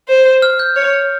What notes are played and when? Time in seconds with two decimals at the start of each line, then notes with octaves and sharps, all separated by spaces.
0.08 C5
0.42 F6
0.59 G6
0.76 C#5